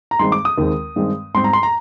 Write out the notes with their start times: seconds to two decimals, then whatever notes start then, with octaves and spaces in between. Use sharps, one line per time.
0.11 A#5
0.19 G2 D#3 G#3 C4 C6
0.32 D6
0.45 D#6
0.58 D#2 D#3 G#3 C4
0.96 G2 D#3 G#3 C4
1.35 G#2 G3 C4 C6
1.44 A#5
1.53 C6
1.63 A#5